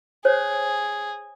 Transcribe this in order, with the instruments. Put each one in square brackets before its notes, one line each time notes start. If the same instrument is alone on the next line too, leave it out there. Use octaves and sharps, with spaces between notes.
[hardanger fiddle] G#4 [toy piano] C5 C#5